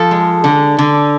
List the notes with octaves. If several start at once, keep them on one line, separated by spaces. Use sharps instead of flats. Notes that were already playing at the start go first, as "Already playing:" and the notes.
Already playing: F3 A4
G#3
D3
D3